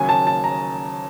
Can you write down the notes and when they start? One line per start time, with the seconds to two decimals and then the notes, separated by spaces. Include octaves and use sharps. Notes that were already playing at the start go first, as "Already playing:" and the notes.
Already playing: D#2 C#3 F#3 G#5
0.09 A5
0.27 A5
0.44 A#5